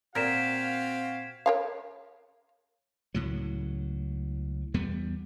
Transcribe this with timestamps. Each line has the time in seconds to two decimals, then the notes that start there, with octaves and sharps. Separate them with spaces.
0.15 A#2 C4 F#4 A#4 F5 G#6 B6 E7
1.46 A#4 C#5 F5
3.14 C#2 A2 F#3
4.74 E2 G3 B3